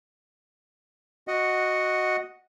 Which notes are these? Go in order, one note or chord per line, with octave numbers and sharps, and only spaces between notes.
F#4 D#5 F#5